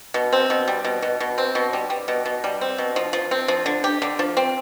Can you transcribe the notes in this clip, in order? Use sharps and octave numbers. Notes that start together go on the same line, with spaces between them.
B2
C4
B2
G3
B2
B2
B2
C4
B2
G3
G3
B2
B2
G3
C4
B2
F3
F3
C4
F3
D3
G4
D3
F3
C4